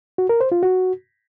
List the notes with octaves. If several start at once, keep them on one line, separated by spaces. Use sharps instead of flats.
F#4
A#4
C5
F4
F#4